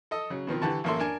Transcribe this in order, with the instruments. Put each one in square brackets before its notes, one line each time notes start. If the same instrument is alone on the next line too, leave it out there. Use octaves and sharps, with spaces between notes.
[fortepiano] A4 D#5
C#3 F#3
B2 D#3 F3 C4
D3 E3 G4 A5 C#6
A1 F#2 A#3 A4 E5 C6
D4 A#4 G#5